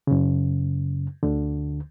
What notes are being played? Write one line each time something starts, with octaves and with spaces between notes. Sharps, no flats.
F#2 C#3
D2 D3